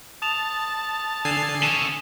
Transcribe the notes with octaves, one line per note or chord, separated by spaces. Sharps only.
A5 D#6 E7 F7
D3 G#5 E6 C7 E7 F7
C#4 A4